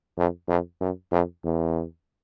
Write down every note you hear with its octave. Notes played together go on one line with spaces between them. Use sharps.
F2
F2
F#2
F2
E2